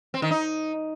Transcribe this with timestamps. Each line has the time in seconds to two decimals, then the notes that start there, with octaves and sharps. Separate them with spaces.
0.14 C4
0.22 D#3
0.31 D#4